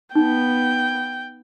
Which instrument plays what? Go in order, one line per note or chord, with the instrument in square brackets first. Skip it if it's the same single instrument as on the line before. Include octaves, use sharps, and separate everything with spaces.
[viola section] B3 [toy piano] D#4 [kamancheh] G5